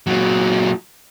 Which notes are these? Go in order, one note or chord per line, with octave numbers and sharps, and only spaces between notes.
A#2 F#3